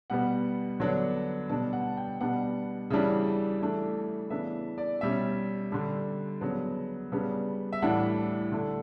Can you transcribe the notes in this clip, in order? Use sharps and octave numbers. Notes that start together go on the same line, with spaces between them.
B2 G3 B3 F#5
D3 F#3 B3 D4
B2 G3 B3 D4 A5
F#5
G5
B2 G3 B3 D4 F#5
C#3 E3 G3 D4
E3 A3 D4
C#3 E3 B3 D4 E5
D5
B2 G3 C#4 E5
D3 G3 D4
C#3 F#3 B3 D4
C#3 G3 B3 D4
E5
A2 E3 G3 D4 F#5
D3 A3 D4